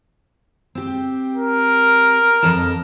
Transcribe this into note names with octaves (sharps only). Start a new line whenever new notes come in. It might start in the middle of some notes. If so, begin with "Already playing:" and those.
C4 G4
A#4
F2 D#5 A5